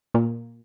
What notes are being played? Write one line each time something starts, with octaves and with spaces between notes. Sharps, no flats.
A#2